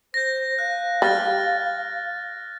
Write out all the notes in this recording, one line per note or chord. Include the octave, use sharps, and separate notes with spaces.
C5 G6 A#6
F5 F#6
G3 F6 A6